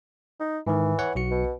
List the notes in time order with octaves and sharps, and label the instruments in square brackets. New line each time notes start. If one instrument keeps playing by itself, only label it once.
[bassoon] D#4
[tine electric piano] G#2 D#3 [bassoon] E3
[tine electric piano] B4 C#5 F#5
B1 F#4 C#7
[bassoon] B2